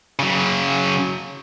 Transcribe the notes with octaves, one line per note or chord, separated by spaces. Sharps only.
C#3 F#3